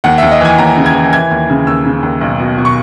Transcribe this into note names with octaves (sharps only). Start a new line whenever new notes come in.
D#2 F#5
D#2 E5
D#5
E3 G#5
D#2 A#5
C#3
G#6
E3
E3 G#6
D#2
C#3
D#2 E6
C#3
D#2
B1
B2
B2
C#6